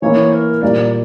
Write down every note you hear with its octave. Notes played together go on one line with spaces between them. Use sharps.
E3 A#3 E4 C#5
A#4
A#2 G3 A#3 D5